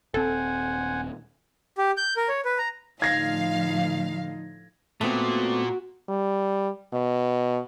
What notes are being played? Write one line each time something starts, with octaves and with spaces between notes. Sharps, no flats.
D#1 C4 A4 C5 F#5 G#5
G4
G6
A#4
C#5
B4
A#5
A2 D3 F3 D#4 F5 G#6 A#6
A#2 A3 B3 C4 F#4
G3
B2